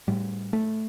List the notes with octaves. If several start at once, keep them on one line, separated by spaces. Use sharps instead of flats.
A2 G3
A3